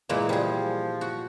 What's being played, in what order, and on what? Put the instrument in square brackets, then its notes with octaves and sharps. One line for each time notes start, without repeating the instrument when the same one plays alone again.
[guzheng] A#2 E3 G#3 [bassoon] A#3
[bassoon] F3 [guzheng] G3 G#4
[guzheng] F#4